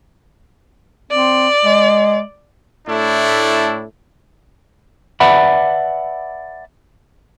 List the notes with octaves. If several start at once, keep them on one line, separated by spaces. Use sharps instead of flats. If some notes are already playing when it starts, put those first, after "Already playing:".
C4 D5
G#3
A2 A3 D4 E4
B4 D5 E5 F#5 A5 B5